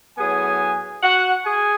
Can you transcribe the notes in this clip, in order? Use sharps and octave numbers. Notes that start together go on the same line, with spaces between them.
A2 F#3 B3 G#4 G#5
F#4 F#5
G#4 G#5